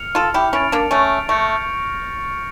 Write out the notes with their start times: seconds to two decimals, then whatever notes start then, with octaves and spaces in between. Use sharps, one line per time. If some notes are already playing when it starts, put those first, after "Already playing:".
Already playing: F6 C#7 F7
0.15 F4 A4
0.34 E4 G4
0.53 C#4 E4 A6 D7 F7
0.72 A#3 D4
0.91 A3 C#4
1.29 A3 C#6 G6 A#6 C#7